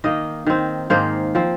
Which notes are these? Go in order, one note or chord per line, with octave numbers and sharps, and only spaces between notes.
D#3 A#3 D#5
D#3 C4
G#2 D#3 A#3 C5
F3 C4